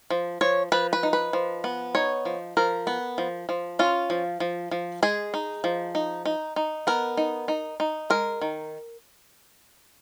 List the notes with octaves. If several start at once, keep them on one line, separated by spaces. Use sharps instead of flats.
F3
F3 C#5
F3 B4
B4
D#4
B4
F3
B3
D#4 C#5
F3
F3 A#4
B3
F3
F3
C#4 F4
F3
F3
F3
G#3 G#4
D#4
F3
D#4
D#4
D#4
B3 A#4
D#4
D#4
D#4
G#3 A#4
D#3